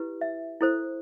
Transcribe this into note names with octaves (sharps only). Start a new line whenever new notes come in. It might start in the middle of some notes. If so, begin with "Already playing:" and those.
Already playing: E4 G4 B4
E5
E4 A4 C5